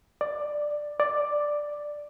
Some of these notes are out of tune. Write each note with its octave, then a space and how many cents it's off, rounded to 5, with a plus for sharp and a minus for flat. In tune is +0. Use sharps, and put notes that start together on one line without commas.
D5 +10
D5 +5